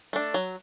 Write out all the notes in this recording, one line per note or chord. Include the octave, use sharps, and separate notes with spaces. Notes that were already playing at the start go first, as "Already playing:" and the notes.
A3 D4
F#3